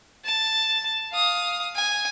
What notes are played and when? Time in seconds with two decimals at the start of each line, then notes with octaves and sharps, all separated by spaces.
0.25 A5
1.12 F5 D#6
1.75 G#5